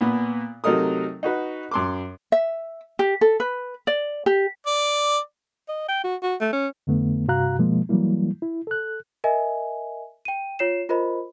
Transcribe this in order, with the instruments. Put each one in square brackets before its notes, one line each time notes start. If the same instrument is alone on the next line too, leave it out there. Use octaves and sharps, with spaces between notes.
[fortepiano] A#2 B3
C3 F#3 A3 D#4 A#4 D#6
D#4 F#4 B4
F#2 C6 D6
[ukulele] E5
G4
A4
B4
D5
G4
[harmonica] D5
[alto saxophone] D#5
G5
F#4
F#4
A3
C#4
[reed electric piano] F2 D3 A3 B3
G2 C3 F#4 F5 A#5 F#6
B2 F3 G#3 A#3
E3 F#3 G3 A#3 E4
E4
A4 F#6
[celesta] A#4 D#5 E5 G#5
G5 D#7
F4 C#5 C7 E7
F4 A#4 C5 D#5 B5